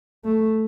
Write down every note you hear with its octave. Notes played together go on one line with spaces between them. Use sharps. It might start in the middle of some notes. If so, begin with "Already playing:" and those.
A3